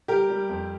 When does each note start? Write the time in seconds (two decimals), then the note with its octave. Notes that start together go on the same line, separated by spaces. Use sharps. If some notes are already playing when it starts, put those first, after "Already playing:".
0.08 G3 G4 A#4
0.30 G3
0.49 F2